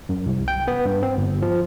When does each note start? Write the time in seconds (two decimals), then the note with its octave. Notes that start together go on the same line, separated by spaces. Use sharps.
0.09 F#2
0.26 C2
0.48 G5
0.68 B3
0.85 G2
1.03 C4
1.17 G1
1.42 F3